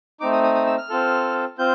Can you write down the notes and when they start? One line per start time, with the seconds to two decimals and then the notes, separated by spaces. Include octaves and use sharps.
0.20 A3 C4 D#4 D6
0.32 D#6
0.43 D#6
0.55 D#6
0.67 E6
0.78 F6
0.89 C4 F4 A4
1.59 C4 F4 G6